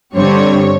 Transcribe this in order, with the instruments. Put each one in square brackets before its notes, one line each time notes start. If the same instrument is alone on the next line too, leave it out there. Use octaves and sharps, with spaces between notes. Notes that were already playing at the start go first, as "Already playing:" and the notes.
[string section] G2 D3 G3 C4 C#5